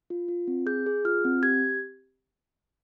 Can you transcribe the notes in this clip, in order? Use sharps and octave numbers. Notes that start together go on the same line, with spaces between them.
F4
F4
C4
G#4 G6
G#4
F4 F6
C4
G4 G#6